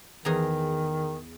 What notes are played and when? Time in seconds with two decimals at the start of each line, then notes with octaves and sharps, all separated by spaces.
0.25 E2 D#3 G#4 A#5